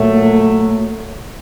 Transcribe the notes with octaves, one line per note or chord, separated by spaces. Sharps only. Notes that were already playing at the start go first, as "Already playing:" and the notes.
Already playing: A#2 F#3 A3